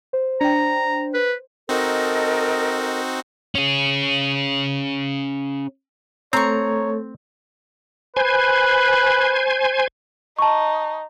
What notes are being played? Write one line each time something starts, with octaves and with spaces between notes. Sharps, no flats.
C5
D4 G5 A#5
B4
C4 D#4 F#4 A4 A#4 D#5
C#4 G#4
A3 C4 A4 C#5 A#5 C#6
B4 C5 G#5
D#4 A5 C#6